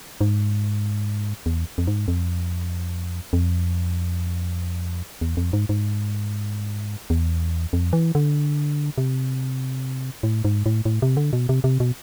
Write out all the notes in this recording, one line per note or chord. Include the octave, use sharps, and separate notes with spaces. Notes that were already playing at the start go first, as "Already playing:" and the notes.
G#2
E2
F2
G#2
F2
F2
E2
F2
G#2
G#2
E2
F2
E3
D3
C3
A2
G#2
A2
A2
C3
D3
B2
C3
C3
B2